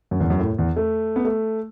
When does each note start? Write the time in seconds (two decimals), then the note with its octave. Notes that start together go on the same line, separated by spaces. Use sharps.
0.11 F#2
0.20 E2
0.30 F#2
0.40 A2
0.59 E2
0.77 A3
1.16 B3
1.25 A3